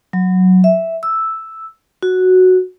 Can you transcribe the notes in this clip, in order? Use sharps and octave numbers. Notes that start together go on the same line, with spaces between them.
F#3
E5
E6
F#4